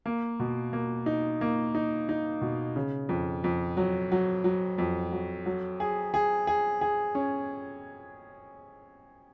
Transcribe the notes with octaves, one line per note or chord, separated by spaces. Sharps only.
A#3
B2
A#3
D#4
A#3
D#4
D#4
B2
C#3
F2
F2
F#3
F#3
F#3
F2
F#3
F#3
G#4
G#4
G#4
G#4
C#4